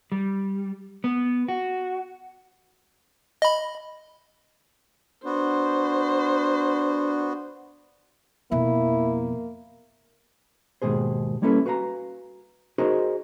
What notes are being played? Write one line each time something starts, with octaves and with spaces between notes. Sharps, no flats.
G3
B3
F#4
D#5 B5
B3 D4 F#4 C5
F2 B2 A#3 E4
D#2 G#2 B2 G#4 C5
G3 A#3 C#4 E4 A4 B4
F#4 B4 F5 G#5 A#5
D#4 F#4 G#4 A#4 C5 D#5